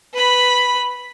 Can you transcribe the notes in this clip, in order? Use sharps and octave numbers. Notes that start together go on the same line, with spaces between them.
B4 B5